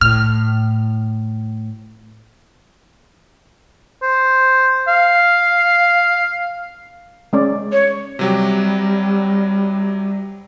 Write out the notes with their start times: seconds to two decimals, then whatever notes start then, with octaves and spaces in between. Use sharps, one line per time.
0.01 A2 F6
4.02 C5
4.88 F5
7.33 G#3 C#4 D5
7.72 C#5
8.19 C3 F#3 G3 G4